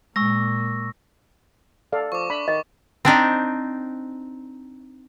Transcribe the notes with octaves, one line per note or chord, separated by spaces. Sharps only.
A#2 G#3 A#3 C#6 E6 A#6
A4 D5 F5
F3 C#6 D6
D4 B5
D#3 D#5
C4 D4 D#4